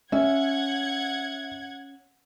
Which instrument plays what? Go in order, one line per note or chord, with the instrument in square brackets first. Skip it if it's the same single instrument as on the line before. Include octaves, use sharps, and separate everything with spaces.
[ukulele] C#4 [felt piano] E5 [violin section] F#5 G#6